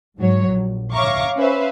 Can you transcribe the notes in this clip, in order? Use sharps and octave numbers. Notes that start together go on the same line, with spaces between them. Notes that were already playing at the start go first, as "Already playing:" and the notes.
G#2 F#3 C#5
A#1
C#5 E5 F5 A#5 C#6 D6
C#4 B4 C5 E5 F5